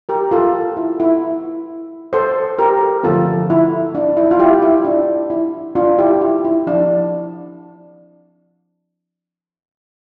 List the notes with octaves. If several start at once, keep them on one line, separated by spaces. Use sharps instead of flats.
G4 A#4
F4 A4
E4
E4
A4 C5
G4 A#4
D3 F3 A3 C4 F4 A4
E4
D4
E4
F4
E4 G4
E4
D4
E4
D4 F4
E4 G4
E4
E4
F3 C4 D4